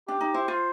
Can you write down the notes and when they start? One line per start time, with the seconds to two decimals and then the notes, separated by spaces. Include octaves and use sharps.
0.07 D4 G4
0.21 D#4
0.34 E4 C5
0.48 F4